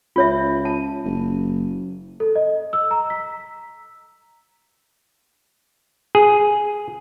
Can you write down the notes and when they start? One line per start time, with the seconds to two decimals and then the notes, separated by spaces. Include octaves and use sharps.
0.16 C#2 F4 C#5 E5
0.65 A5
1.05 F#1
2.20 A4
2.36 D#5
2.73 E6
2.91 A#5
3.10 B6
6.15 G#4